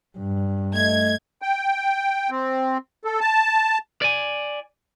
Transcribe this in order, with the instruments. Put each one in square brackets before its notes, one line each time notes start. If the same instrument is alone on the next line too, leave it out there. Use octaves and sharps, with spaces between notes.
[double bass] G2
[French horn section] A3 D#5 [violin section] G#6
[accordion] G5
C4
A4
A5
[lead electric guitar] D5 G#5